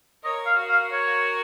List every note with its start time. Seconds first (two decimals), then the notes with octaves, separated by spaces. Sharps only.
0.23 A#4 C#5 D#5
0.46 F5
0.57 F#4 A#4
0.69 F5
0.92 C#5